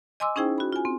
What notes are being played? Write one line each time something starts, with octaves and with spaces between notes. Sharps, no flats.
D#5 G#5 C6 D6 E6
C#4 D#4 E4 G#4 C5 G5
F#4 B5
F4 G#5
C4